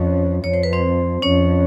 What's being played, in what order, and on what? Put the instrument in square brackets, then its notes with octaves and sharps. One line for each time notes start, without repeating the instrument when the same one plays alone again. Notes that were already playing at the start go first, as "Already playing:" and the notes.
Already playing: [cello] F2 [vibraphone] C#4 C#5
[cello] F2 [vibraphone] C#5
[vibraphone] C5
B4
C4 C5
[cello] F2 [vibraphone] C#4 C#5